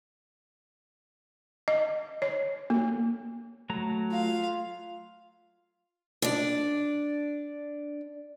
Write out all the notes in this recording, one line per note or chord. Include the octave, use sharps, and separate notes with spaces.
D#5
C#5
A#3
F#3 A3 A#5
F4 F5
D4 D5